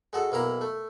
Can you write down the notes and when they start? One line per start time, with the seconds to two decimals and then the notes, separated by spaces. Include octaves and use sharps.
0.13 G#3 F#4 A4
0.32 B1 A#3 E4 A#5
0.61 A3